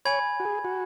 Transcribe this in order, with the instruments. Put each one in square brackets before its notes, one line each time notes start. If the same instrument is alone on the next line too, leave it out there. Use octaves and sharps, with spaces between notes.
[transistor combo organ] C#5 [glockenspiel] G#5 B5 G#6
[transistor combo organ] F#4
G#4
F#4